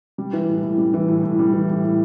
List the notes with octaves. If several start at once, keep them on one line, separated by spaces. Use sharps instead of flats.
G3
E3
A2
A2
G3
E3
A2
A2
G3
E3
A2
A2